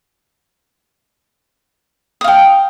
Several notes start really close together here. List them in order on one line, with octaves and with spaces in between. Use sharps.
D#6 F5 G5